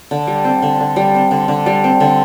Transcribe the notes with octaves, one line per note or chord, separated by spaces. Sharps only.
D3
G3
C4
D3
D3
G3
C4
D3
D3
G3
C4
D3